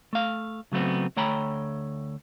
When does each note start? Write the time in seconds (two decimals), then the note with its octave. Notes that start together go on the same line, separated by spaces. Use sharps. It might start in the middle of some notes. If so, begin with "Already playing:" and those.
0.13 A3 F5
0.72 C#3 F#3 A3 B3 C4
1.17 D2 A3 C#5 G5 A#5 B5